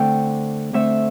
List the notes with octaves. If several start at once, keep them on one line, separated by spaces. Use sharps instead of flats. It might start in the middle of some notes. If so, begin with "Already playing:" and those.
Already playing: D3 A3 C4 G5
D3 A3 C4 E5